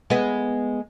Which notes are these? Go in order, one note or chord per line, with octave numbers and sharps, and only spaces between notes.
G#3 B3